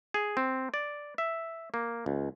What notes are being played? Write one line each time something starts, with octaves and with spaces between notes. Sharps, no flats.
G#4
C4
D5
E5
A#3
C#2